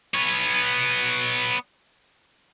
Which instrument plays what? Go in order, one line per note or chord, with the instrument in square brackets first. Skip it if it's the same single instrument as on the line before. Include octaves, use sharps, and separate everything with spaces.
[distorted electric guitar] B3 C#5